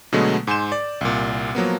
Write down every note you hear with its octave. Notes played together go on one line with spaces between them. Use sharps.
B2 D3 F#3 G#3 A3 B3
G#2 G#5 C6 G6 E7
D5
C2 A#2
F3 F#3 A#3 B3